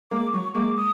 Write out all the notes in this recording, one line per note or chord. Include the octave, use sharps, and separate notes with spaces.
G#3 A#3 D6
F#3 C#6
G#3 A#3 D6
D#6